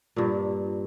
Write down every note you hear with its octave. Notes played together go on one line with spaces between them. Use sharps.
G2 A#2